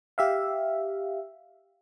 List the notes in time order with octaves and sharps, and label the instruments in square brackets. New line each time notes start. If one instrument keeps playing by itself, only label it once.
[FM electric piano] G4 E5 F5